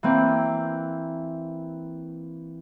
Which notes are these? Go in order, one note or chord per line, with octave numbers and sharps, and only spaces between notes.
E3 A#3 C4